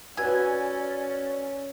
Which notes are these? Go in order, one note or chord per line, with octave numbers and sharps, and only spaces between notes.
C#4 F#4 B4 D5 G#5 E6